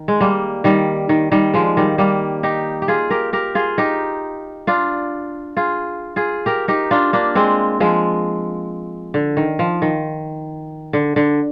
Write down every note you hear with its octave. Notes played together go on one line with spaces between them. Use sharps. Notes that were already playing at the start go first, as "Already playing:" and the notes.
Already playing: D#3
G#3
G3 A#3
D#3 G3
D#3
D#3 G3
F3 G#3
D#3 G3
G3 A#3
D#4 G4
G4
F4 G#4
G4 A#4
G4 A#4
F4 G#4
D#4 G4
D4 F4
F4 G#4
F4 G#4
G4 A#4
D#4 G4
D4 F4
A#3 D4
G#3 C4
F3 G#3
D3
D#3
F3
D#3
D3
D3